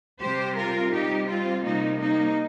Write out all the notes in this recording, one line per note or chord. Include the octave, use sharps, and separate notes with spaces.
C3 G3 G4 C5
F4 A#4
C3 G3 D#4 G4
C4 F4
C3 G3 A#3 D#4
A#3 D#4